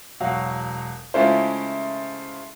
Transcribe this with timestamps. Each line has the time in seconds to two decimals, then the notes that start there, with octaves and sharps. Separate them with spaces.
0.20 E1 F#3 F#4 F5
1.14 C#3 G#3 A3 E4 F4 C5